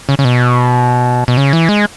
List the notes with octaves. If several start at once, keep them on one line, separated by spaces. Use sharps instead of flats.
C#3
C#3
B2
B2
C#3
E3
G#3